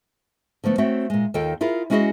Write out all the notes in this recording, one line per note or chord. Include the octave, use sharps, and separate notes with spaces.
D3 F3 A3 B3
A3 C4 F#4 C#5 E5
A#2 G#3
D#2 D#3 D#4 F4 A4 G5
E4 F4 G#4 A#4
G#3 C#4 E4 F#4 G#4 D#5